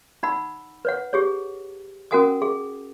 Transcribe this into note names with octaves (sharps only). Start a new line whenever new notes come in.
D#4 F#5 B5 E6
B4 C#5 F#5
G4 G#4 C#5
C#4 F#4 A#4 F#5 G#5 D#6
G#4